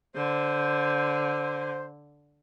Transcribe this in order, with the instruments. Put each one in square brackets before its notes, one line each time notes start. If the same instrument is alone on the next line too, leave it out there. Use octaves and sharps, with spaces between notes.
[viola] D3 [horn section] C5